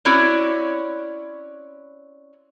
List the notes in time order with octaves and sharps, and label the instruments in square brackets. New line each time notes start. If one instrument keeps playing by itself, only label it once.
[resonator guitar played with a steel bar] C4 C#4 E4 F#4 C#5 D5